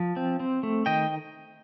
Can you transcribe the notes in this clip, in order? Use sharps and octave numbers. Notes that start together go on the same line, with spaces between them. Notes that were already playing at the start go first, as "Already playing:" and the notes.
Already playing: F3
C4
C4
A3
D#3 D#5 G5